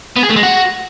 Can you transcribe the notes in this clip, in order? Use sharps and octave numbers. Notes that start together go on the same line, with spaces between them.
B3
G#4
A3
G#3
F#4